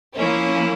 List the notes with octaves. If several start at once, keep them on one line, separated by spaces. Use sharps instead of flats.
F3 A#3 C#4 E4